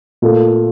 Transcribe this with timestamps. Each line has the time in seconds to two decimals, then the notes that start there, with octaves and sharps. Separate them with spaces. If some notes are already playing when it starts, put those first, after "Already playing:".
0.22 A#2 A3